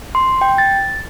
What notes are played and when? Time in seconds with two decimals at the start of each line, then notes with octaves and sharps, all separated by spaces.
0.15 C6
0.41 G5
0.58 A6